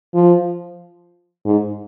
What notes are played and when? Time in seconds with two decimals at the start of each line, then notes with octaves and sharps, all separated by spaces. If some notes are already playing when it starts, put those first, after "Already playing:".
0.14 F3
1.45 G#2